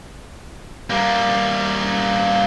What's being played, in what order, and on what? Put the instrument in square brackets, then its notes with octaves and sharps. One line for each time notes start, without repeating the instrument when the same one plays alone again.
[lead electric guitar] G3 A#3